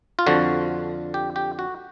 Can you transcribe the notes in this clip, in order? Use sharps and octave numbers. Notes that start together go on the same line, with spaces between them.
F4
F2 D3 F3 F#4
G4
G4
F#4